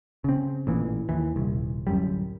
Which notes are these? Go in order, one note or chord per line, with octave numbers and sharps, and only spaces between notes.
C#3 C4
A1 A#2 E3
D#2 E3
D#1 C2
D1 F#2 G3